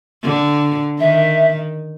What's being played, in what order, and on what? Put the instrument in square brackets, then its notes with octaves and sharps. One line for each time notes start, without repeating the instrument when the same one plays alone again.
[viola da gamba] D3
[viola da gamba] D#3 [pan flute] E5